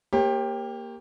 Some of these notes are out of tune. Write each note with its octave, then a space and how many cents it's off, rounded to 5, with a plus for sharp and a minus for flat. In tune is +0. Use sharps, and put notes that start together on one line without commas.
A#3 +0 G4 +15 C#5 -45